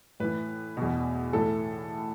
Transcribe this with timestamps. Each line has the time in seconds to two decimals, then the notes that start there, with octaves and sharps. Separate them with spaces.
0.20 A2 E3 B4
0.77 E2 B2
1.33 A2 E3 A4